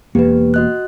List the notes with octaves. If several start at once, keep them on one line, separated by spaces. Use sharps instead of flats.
E1 E2 A#3 G4 B4
F#4 D#5 F#6